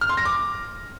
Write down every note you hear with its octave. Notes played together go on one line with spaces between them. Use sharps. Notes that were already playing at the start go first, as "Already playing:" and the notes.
F6
C6
A#6
D6